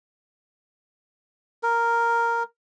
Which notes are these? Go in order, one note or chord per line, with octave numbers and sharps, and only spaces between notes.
A#4